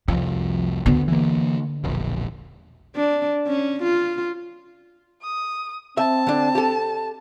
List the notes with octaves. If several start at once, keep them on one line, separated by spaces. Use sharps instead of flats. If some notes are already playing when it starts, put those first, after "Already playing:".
C2 F2 F3
D2 D3 B3
E3 A#3
E1 A#1
D4
C#4
F4
D#6
C4 E5 A5
D3 D4
G4 A4